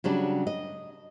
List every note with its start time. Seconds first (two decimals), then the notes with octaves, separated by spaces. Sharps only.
0.04 C#3 F#3 G3 D4
0.47 D#5